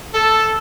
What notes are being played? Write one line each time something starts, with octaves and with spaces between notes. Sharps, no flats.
A4